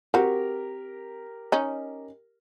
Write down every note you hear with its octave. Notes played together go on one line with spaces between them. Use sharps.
C4 F#4 G4 A#4
C#4 D#4